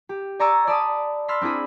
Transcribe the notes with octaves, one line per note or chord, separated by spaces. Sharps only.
G4
D5 G#5 A#5 C#6 E6 A6
D5 A5 B5 D#6
B5 C6 E6 F6 A6 B6
C4 D4 E4 G#4 B5